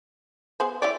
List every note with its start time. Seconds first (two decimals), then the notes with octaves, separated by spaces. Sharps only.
0.60 B3 G#4 C5
0.82 E4 G4 C#5 D5